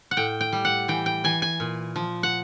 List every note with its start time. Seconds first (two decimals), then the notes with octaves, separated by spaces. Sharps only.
0.11 F#5
0.17 A2 G5
0.41 G5
0.52 G3
0.65 F#5
0.88 E3 G5
1.06 G5
1.24 E3 G#5
1.42 G#5
1.60 A#2
1.96 F3
2.23 F#5